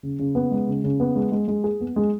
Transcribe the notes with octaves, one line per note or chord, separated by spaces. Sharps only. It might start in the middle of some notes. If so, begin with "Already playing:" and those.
C#3
C#3
B3
G#3
C#3
C#3
B3
G#3
G#3
G#3
G#4
B3
G#3